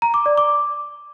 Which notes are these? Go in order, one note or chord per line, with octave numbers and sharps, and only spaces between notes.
A#5
D6
D5
D6